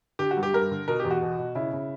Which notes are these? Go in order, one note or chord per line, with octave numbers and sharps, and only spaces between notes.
D3 G4
F#4
G2
G4
G2 A#4
D3
B2 A#4
E2 G4
F#4
B2
B2
C#3 E4
C#3